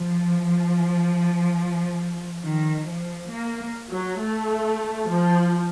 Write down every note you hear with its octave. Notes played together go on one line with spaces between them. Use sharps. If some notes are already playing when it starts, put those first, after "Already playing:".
Already playing: F3
D#3
F3
A#3
F#3
A3
F3